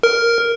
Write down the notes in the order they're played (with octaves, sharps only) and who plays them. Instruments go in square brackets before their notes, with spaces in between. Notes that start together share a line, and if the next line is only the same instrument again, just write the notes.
[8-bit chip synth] A#4